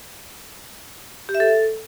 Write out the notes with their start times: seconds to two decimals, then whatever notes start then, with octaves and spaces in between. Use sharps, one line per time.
1.29 G4
1.35 E5
1.40 A4